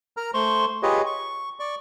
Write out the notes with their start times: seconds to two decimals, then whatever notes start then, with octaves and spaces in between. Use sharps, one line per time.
0.17 A#4 A#5 F6
0.34 A3 C5 C6 C#6
0.83 F4 G4 G#4 B4 C#5 D#5
1.06 C#6
1.59 D5 C#6